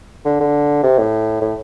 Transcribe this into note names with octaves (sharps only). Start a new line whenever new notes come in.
D3
D3
C3
A2
A2